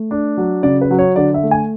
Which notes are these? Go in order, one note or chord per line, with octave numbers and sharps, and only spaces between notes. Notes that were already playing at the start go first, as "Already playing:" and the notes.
Already playing: A3
D4
F#3
C#3 D5
B4
F#3
C#5
D3 D5
E5
A3
G#5